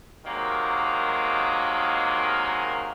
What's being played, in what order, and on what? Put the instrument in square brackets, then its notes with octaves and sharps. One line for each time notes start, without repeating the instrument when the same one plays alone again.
[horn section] C3 D#3 F#3 G#3 A#3